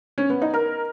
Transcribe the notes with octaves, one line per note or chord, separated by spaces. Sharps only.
C#4
B3
D#4
A#4